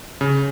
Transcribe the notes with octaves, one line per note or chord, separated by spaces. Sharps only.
C#3